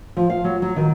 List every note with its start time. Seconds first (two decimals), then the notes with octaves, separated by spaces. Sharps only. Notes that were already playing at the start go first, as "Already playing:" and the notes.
0.17 F3
0.30 F5
0.44 F#3
0.62 F#3
0.76 D#3